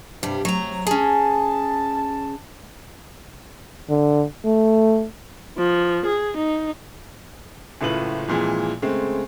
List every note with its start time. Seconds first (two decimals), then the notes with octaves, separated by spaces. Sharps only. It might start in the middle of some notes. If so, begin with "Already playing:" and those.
0.23 G2 C3 G3
0.45 C3 F#3 A3 A#5
0.87 C#4 G#4 A5
3.89 D3
4.45 A3
5.58 F3
6.06 G#4
6.37 D#4
7.81 F#1 C#2 A2 F4 B4 F#7
8.28 F2 A#2 E3 G#3
8.82 C#3 G#3 A3 C4